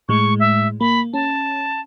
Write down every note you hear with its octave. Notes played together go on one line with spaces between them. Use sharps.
A2 G#3 C#6
E5
A#3 B5
C#4 A5